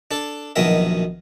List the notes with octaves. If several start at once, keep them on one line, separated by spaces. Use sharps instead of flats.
D4 A4
A#1 F#2 B2 D#3 A#4 E5